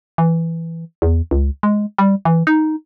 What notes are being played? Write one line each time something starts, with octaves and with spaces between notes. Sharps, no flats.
E3
E2
C#2
G#3
G3
E3
D#4